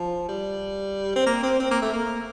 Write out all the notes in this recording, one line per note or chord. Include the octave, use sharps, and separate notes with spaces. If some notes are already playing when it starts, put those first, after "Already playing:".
Already playing: F3
G3
C4
A#3
C4
C4
A#3
A3
A#3